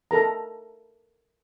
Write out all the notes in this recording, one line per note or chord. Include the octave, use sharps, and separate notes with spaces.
A4 A#4 A#5